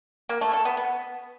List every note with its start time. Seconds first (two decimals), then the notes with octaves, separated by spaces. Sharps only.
0.29 A#3
0.41 A3
0.53 A4
0.65 B3
0.77 B3